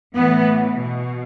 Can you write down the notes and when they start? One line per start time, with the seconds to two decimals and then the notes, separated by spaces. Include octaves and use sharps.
0.15 A2 E3 B3
0.75 B2